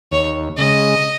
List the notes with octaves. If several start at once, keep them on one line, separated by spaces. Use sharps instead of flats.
D#2 C#5
C#3 G#3 D#5